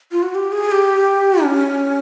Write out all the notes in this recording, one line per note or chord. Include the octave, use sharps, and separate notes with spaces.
F4
F#4
G4
G#4
G4
C#4